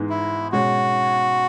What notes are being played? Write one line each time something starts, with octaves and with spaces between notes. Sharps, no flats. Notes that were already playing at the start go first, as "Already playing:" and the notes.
Already playing: G#2 E3 G#3 B3 D#4
E4
B2 G#3 C#4 F#4